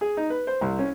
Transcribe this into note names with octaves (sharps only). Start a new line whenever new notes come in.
G#4
D#4
B4
C5
C2
C#4